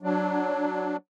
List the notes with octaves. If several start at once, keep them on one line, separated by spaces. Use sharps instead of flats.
F#3 D4